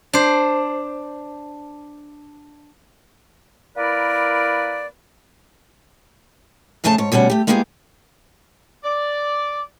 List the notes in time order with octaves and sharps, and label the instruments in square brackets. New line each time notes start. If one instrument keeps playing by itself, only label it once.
[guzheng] D4 C5
[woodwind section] A#3 E4 A#4 B4 D5
[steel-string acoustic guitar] F2 C#3 A3 G#4 A4 A5
G#2 C#5
D2 B2 G3 C#4 F#5
A3 G4
G#3 A#3 B3 F4 G4 G#4
[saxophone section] D5